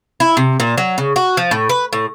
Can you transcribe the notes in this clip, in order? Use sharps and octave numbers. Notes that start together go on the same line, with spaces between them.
E4
C3
A#2
F#3
C#3
F#4
F3
A2
B4
A2